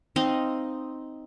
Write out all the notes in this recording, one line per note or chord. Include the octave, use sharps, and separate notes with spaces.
C4 D#4 D#5 F5